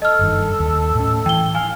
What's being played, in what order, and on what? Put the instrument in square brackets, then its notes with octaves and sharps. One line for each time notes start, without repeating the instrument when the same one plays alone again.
[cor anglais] A4 [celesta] D#5 F6
[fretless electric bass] F#1 G2 D#3
D#2
A2 C#4
[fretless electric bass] E3 [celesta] G5 G7
[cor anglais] F5 [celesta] G#5